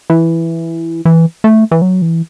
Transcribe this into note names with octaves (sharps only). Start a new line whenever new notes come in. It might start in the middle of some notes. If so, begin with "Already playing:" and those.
E3
E3
A3
E3
F#3
E3